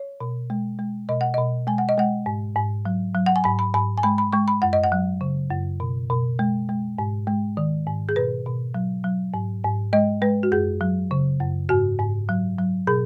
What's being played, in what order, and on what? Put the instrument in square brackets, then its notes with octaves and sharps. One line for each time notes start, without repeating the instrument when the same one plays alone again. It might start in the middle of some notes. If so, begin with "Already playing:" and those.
Already playing: [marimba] C#5
B2
G#3
G#3
B2 D#5
F#5
B2 D#5
G#3 G#5
F#5
D#5
G#3 F#5
G#2
G#2
F#3
F#3
F#5
G#5
G#2 B5
B5
G#2 B5
G#5
G#3 B5
B5
G#3 C#6
B5
F#2 F#5
D#5
F#5
F#3
C#3
F#2
B2
B2
G#3
G#3
G#2
G#3
D#3
G#2
G#4
B2 B4
B2
F#3
F#3
G#2
G#2
G#3 D#5
G#3 B4
F#4
F#2 G#4
F#3
C#3
F#2
G#2 F#4
G#2
F#3
F#3
B2 G#4